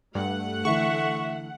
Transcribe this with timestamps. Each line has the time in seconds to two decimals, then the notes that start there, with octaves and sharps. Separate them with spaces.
0.15 G2 A3 F#5
0.65 D3 E3 E5 C#6